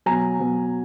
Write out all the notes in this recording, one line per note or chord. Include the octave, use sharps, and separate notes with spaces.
B2 F#3 G#5 A#5
B2 F#3